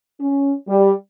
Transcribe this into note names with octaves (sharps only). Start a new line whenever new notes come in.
C#4
G3